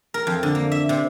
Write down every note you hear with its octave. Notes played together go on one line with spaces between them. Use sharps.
A#4
F2
D3
A#3
E5
C3